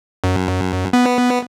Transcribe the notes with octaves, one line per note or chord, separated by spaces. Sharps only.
F#2
B3